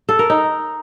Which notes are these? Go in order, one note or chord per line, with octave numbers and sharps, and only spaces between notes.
A4
A#4
D#4